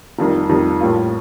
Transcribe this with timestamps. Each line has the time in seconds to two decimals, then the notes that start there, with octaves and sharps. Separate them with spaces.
0.19 F1 F2 D#3 G3
0.49 F1 F2 D#3 G3
0.81 A2 G3 A#3 F4